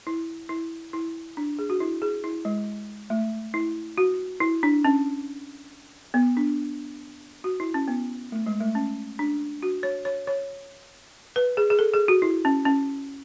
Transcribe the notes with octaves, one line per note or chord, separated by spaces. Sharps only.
E4
E4
E4
D4
G#4
F#4
E4
G#4
E4
G#3
A3
E4
F#4
E4
D4
C#4
B3
D4
F#4
E4
C#4
B3
A3
G#3
A3
C#4
D4
F#4
C#5
C#5
C#5
B4
G#4
G#4
A4
G#4
F#4
E4
C#4
C#4